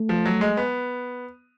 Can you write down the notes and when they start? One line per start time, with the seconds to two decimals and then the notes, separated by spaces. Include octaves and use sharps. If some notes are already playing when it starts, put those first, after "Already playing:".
Already playing: A3
0.09 F3
0.25 F#3
0.41 G#3
0.57 B3